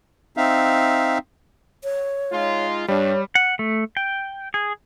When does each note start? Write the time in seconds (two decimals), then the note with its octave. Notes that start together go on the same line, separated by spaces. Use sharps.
0.37 C4 D#4 E5 F5
1.84 C#5
2.32 G#3 D#4 F4
2.88 G2 G3 D4 C#5
3.35 F#5
3.59 A3
3.97 G5
4.54 G#4